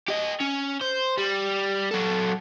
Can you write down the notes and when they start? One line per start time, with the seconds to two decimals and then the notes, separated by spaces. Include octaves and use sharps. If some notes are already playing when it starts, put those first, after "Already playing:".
0.09 G4 D#5
0.41 C#4
0.81 C5
1.18 G3
1.91 F#3 A4